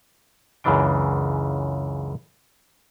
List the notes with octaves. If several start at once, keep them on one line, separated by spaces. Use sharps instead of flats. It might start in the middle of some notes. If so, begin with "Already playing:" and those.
C#2 F#2 C#3 E3 D4 G5